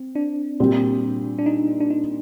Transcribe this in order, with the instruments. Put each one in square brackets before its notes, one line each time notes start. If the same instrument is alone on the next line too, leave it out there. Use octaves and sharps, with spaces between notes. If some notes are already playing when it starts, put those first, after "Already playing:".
Already playing: [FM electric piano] C4
D4
[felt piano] A#2 G3 C4 G4
[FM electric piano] D4
D#4
D4
D#4